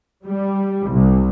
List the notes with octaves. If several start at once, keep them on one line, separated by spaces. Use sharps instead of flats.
G3
C2